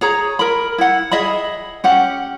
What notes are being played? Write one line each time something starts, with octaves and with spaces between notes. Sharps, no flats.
G#4 C#5 A#5
A#4 B5
E4 F#5
G#4 D#5 E5 B5
C#4 G4 F#5